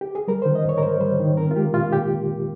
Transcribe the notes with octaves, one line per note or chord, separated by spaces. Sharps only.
G4
G#4
G3 A#4
D#3 C5
D#5
G#2 C#5
A#4
G#2 C5
G3 C5
D#3
C4 A#4
F4
G#3 G4
A#2 F4
A#2 G4